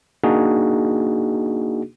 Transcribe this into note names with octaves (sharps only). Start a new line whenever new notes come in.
A#3 D4 D#4 F#4 G#4